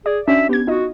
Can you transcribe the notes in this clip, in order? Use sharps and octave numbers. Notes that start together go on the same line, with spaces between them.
G#4 D5
C#4 D4 F#4 E5
B3 G4 G#6
D#4 F4 F#4 D#5